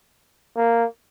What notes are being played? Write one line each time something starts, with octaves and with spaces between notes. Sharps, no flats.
A#3